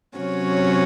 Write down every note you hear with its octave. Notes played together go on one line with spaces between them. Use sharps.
C3 F#3 C#4 F#4 C#5